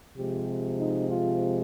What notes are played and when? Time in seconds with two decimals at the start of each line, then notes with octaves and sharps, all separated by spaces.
0.17 C3 F3 G#3 G4
0.79 D#4
1.10 F4